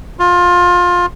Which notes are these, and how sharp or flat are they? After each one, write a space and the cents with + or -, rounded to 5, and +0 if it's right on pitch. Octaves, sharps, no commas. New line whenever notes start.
F4 +20